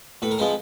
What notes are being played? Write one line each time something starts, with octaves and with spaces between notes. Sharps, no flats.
A2 B4
A#4
F3 G#3 C4 B4